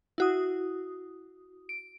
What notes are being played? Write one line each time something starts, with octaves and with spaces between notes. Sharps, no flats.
E4 F#4 D#6
D7